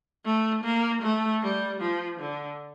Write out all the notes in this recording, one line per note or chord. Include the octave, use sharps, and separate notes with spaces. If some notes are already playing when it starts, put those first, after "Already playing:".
A3
A#3
A3
G3
F3
D3